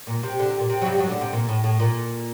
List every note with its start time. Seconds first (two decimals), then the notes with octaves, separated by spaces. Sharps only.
0.07 A#2
0.23 C3
0.39 D3
0.49 C3
0.59 A#2
0.70 C3
0.82 F#3
0.86 G2 G3
0.98 F#2 F#3
1.09 D2 D3
1.21 C3
1.33 A#2
1.49 A2
1.64 A2
1.80 A#2